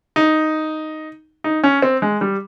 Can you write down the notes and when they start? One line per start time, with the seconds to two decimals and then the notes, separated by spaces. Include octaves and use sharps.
0.16 D#4
1.44 D#4
1.63 C#4
1.82 C4
2.02 G#3
2.21 G3